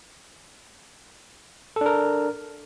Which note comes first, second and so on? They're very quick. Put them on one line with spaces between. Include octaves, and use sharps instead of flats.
A4 D4 A#4